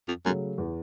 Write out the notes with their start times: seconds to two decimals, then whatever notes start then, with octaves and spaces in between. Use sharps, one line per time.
0.08 F2
0.25 F#2 C#3 F#3 A3
0.58 E2